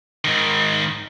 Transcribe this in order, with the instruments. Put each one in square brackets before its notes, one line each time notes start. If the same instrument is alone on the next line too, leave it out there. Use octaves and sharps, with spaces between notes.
[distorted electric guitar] G#2 D#3